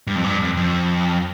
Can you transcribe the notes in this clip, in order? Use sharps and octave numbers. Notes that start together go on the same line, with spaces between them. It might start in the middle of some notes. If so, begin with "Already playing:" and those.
G2
F2
G2
F2
F2